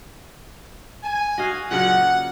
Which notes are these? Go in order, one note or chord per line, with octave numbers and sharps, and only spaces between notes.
G#5
F#4 D#5 F5
A#2 C#3 F#3 F#5